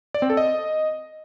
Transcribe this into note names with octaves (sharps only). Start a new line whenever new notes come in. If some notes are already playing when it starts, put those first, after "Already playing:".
D5
C4
A4
D#5